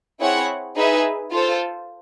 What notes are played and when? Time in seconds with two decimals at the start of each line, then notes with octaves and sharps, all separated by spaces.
0.20 C4 E4 G#4 C#5 F#5
0.76 D#4 G#4 B4 E5
1.32 F4 A4 C5